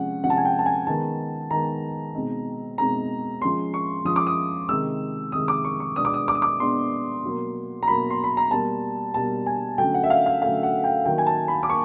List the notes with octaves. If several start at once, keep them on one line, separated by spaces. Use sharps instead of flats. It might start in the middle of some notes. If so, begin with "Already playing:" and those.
Already playing: C3 F3 G#3 C#4 F#5
C3 F3 G#3 C#4 F#5
A5
G#5
G5
A5
G#5
D#3 G#3 B3 A5
D#3 G#3 B3 A#5
B2 G#3 C4 D#4
B2 G#3 C4 D#4 A#5
F3 G#3 C#4 C6
C#6
F3 G#3 C#4 D#6
D6
D#6
C3 D#3 G#3 E6
C3 D#3 G#3 D#6
D6
C#6
C#6
B2 G#3 B3 D4 D#6
D6
D#6
D6
D#6
D6
B2 G#3 B3 D4 C6
B2 F#3 A#3
A#5
B2 F#3 A#3 B5
C6
B5
A#5
B2 G3 A#3 A5
B2 G3 A#3 A5
G#5
D3 F#3 A3 C#4 G5
F#5
E5
F5
F5
D3 F#3 A3 C#4 F5
F#5
G5
D#3 F#3 A#3 G5
G#5
A5
B5
D6
A#3 C#6